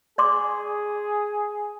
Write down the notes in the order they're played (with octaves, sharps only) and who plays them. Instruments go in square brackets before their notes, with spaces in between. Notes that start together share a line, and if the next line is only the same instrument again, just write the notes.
[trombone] G#4 [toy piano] D5 C6 D6